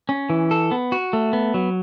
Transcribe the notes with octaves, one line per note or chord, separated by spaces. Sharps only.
C#4
E3
A4
B3
F#4
A3
B3
F#3